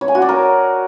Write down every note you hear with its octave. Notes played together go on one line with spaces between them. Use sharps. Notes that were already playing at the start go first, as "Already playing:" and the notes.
C#5
G#5
F#4
D5
A#4